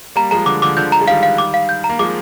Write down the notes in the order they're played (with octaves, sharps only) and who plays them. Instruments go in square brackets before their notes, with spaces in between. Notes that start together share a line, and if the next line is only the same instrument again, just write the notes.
[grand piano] G3 A#3 [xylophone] A#5
[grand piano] F3 G#3 [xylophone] A#5
[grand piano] D3 F3 [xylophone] D6
[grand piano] D3 F3 [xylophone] D6
[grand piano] D3 F3 [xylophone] G6
[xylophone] A#5
[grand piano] G#3
[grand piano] D#3 G3 [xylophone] F5
[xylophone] F5
D6
F5
G6
A#5
[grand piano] A#3
[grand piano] F3 G#3 [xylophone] D6